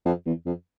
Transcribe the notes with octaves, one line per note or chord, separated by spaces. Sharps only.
F2
E2
F2